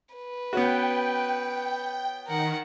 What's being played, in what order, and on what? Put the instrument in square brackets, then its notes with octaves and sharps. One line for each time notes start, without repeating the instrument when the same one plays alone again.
[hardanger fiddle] B4
[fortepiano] B3 C#4 F#4 [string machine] G5
[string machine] D#3 [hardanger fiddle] A#4 F#5